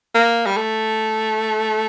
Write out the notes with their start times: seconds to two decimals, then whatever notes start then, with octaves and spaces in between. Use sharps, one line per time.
0.15 A#3
0.46 G3
0.57 A3